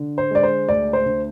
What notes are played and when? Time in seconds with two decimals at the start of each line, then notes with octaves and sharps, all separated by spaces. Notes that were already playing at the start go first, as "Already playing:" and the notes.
Already playing: D3
0.18 C5
0.31 G#3 D5
0.43 C5
0.68 D2 D5
0.93 C5
1.06 D3